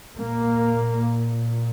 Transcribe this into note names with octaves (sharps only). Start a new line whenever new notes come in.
A#2 A#3